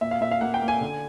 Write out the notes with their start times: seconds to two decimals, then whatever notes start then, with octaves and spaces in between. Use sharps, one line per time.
0.01 A#2 E5
0.11 F5
0.21 A#2 E5
0.31 F5
0.41 A#3 F#5
0.54 G5
0.62 A#3
0.68 G#5
0.81 D3